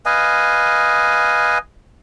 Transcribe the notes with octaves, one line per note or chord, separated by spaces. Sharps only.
B4 D#5 F5 G#5